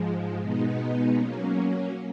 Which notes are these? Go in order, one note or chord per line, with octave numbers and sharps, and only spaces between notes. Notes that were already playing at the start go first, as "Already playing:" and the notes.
Already playing: G#2 F3 G#3
B2 G#3 B3 D#4
F#3 A#3 C#4